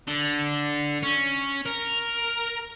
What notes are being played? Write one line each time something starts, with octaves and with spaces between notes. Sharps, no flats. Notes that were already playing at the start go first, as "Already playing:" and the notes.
D3
C#4
A#4